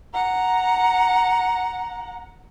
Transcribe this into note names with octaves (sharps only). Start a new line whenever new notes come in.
F#5 A#5